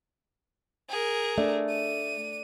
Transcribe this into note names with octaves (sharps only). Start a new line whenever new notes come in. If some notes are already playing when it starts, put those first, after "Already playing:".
G#4 A#4
A3 D4
D#7